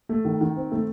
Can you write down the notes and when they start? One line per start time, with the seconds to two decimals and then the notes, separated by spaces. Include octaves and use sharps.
0.09 A3
0.25 D#3
0.41 D#3
0.56 C4
0.72 A3